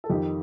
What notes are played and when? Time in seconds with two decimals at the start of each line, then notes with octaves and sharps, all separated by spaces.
0.04 A4
0.10 F2 D#3 G4